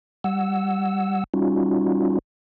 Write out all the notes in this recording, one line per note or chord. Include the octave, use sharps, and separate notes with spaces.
G3 F#5 E6
G3 C#4 D#4 F4 F#4